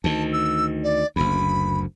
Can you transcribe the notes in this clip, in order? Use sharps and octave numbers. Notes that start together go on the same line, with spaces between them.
D2 D#3 A5
E6
D5
F#1 D2 B5